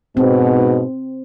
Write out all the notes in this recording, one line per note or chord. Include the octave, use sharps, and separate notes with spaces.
G#2 B2 C4